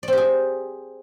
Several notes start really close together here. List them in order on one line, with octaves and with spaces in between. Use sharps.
D5 C4 G4 G#4